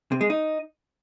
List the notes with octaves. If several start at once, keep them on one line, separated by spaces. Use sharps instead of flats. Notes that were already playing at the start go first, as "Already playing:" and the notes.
C3
G#3
D#4